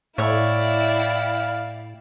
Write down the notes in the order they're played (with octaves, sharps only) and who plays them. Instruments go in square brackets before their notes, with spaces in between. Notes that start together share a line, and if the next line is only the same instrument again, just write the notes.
[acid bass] A2 [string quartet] E4 D5 G5 [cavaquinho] C#5 E5 [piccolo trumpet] F5